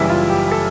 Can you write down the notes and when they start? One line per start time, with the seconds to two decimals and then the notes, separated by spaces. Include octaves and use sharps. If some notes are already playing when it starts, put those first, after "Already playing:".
Already playing: F#1 F#2 C#3 E3 G3 E4
0.09 F4
0.30 G4
0.51 A4